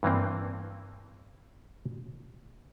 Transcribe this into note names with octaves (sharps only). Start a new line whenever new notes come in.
G2 E3 A#3 C4